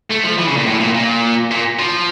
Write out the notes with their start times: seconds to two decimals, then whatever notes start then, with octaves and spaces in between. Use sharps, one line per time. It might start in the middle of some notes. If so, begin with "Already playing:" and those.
0.10 A3
0.24 F3
0.38 E3
0.48 C#3
0.57 A#2
0.66 A2
0.80 A#2
0.95 A#2
1.51 A#2
1.79 F3